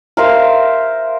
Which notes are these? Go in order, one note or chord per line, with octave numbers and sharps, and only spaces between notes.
A#4 C5 E5 F5